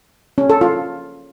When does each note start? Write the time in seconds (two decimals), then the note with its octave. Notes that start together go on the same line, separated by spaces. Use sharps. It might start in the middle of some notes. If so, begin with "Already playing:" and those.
0.38 C#4
0.50 A4
0.61 F4